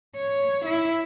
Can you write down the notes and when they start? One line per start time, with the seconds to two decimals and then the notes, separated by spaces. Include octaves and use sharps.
0.16 C#5
0.65 E4